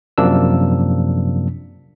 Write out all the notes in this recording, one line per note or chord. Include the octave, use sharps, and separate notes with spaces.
F#2 C3 F3 A#3 D4 E6